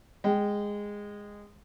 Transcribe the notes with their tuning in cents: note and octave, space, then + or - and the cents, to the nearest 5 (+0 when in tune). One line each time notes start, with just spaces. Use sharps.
G#3 -10 G5 -10